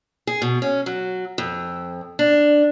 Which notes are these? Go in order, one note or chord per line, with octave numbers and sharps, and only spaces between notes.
G#4
B2
C#4
F#3
F2
D4